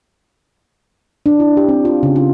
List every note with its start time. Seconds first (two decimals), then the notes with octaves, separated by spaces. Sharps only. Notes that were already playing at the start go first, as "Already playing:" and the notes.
1.26 D4
1.40 E4
1.57 G4
1.69 C4
1.85 F4
2.03 C#3
2.16 F4